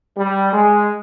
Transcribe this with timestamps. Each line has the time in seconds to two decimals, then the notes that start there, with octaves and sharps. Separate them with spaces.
0.17 G3
0.52 G#3